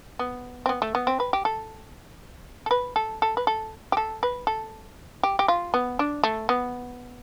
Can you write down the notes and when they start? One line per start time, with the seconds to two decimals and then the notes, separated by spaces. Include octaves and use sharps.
0.19 B3
0.66 C4
0.69 B3
0.82 A3
0.95 B3
1.07 C4
1.20 B4
1.33 G4
1.45 A4
2.66 A4
2.71 B4
2.96 A4
3.22 A4
3.37 B4
3.47 A4
3.92 G4
3.97 A4
4.23 B4
4.47 A4
5.23 G4
5.39 G4
5.48 F4
5.74 B3
5.99 D4
6.24 A3
6.49 B3